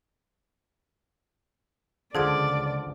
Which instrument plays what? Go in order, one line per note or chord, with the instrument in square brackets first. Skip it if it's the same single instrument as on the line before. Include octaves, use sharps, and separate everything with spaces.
[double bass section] C#2 [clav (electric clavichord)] D3 F3 [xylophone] G#4 G#6 D7 [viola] D5